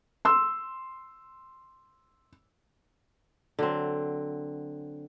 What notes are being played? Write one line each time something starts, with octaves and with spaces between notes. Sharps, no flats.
C6 E6
D3 F#3 C4